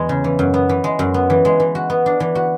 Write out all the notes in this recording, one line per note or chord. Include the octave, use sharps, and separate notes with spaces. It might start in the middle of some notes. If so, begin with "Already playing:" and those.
Already playing: E2 G#3
C#3
E3
F#2
B3
E3
G#3
F#2
B3
E3
G#3
E3
F#4
B3
D4
E3
F#4